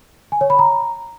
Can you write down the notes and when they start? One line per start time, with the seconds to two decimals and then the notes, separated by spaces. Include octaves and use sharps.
0.32 G#5
0.41 C#5
0.50 B5
0.59 A#5